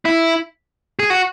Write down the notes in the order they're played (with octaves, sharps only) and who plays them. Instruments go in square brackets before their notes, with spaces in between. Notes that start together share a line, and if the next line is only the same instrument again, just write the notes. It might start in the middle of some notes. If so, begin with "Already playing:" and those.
[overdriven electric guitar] E4
G#4
F#4